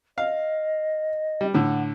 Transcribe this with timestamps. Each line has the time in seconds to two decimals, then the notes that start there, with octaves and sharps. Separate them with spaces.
0.18 D#5 F5
1.41 G3
1.54 A2 D3 F#5